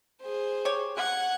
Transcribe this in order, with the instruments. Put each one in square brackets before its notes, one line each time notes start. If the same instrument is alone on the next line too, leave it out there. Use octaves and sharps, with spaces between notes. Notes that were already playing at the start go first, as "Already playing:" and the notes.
[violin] G#4 C5
[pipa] G4 C#5
[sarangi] F#5 [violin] F#6 G#6